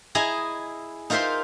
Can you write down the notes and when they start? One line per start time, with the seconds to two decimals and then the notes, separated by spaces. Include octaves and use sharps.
0.15 E4 G#4 D#5 A#5
1.10 D#4 F4 A#4 C5 E5 C6